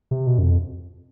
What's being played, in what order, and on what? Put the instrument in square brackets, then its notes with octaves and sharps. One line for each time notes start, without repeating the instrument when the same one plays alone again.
[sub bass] C3
B2
F#2
F2